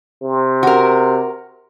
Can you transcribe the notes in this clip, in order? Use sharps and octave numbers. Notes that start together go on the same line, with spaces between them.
C3
F#4 A#4